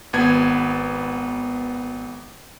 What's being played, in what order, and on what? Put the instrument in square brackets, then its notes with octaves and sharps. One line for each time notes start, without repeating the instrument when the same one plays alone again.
[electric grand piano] G#1 B3 G#6